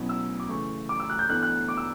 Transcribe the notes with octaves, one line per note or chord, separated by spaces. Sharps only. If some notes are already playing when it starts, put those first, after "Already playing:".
Already playing: B2 F#3 C#4 E4
E6
D6
C#3 E3 A3 C#6
D6
E6
F#6
G6
E3 B3 D4 A4 D5 F#6
F#6
D6
E6